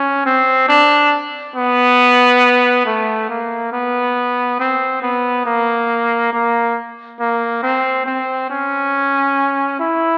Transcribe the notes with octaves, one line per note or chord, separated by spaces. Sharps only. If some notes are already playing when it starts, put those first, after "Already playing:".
Already playing: C#4
C4
D4
B3
A3
A#3
B3
C4
B3
A#3
A#3
A#3
C4
C4
C#4
E4